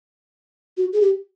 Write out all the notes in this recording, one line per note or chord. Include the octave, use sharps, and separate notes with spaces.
F#4
G#4
G4